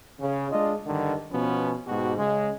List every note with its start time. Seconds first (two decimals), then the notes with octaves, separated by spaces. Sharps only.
0.20 C#3
0.51 G#3 D4 F4 D#5
0.87 G2 D3 D#3
1.31 B2 F3 B3 C#4
1.86 G#2 B2 F#4 G4
2.18 C#3 G#3